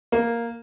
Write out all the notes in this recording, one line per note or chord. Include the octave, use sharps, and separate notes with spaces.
A#3